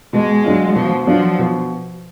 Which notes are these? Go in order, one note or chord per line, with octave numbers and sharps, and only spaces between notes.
B2 G#3
F#3 D4 F4
B2 F3
F3 F#3 D4 F4
B2